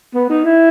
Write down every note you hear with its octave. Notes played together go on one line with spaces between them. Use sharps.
B3
D#4
E4